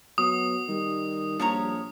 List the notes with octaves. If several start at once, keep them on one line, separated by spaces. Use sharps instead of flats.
F#3 B3 D#6
D#3 G3
A#1 F3 C#5 A#5